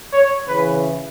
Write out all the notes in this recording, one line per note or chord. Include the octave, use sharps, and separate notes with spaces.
C#5
C#3 E3 B4